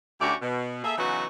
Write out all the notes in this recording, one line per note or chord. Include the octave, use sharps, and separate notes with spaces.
D2 C#4 E4 F#4 G4 D5
B2
A#3 G#4 A4 E5
C#3 E3 F#3 B3 D#4 F#4